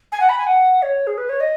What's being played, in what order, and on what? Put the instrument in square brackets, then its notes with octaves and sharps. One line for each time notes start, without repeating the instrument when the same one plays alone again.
[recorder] G#5
F#5
B5
G#5
F#5
C#5
G#4
B4
C#5
D#5